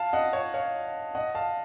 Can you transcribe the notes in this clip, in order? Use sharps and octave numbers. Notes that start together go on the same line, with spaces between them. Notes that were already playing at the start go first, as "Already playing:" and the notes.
Already playing: F5 A5
D#5 F#5
C#5
C#5 F5
D#5 F#5
F5 A5